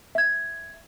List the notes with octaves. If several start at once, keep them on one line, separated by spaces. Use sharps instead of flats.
E5 G#6